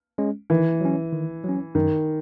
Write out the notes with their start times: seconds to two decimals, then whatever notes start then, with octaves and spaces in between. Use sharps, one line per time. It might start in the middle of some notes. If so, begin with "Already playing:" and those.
0.18 G#3 C#4
0.50 D#3 E3
0.81 F#3 C#4
1.13 D#3
1.44 F#3 C#4
1.75 F#2 D#3